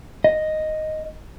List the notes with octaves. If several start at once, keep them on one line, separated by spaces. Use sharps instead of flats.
D#5